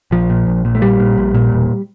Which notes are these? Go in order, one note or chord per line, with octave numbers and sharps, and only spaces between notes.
A#1 F3
A#2
A#1
A#2
A3
A#1 G3
A#2
A#1
A#2
E1